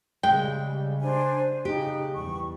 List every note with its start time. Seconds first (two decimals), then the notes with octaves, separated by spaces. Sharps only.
0.23 C#3 G3 G#3 G5
1.02 D4 C5 G#5
1.65 C#3 D#4 G4 F#6
2.13 E2 G3 C#6